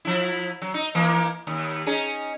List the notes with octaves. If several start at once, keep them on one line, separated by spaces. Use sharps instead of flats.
F3 E4
F#3
D#4
E3 A#3
D#2
C#4 D#4 G#4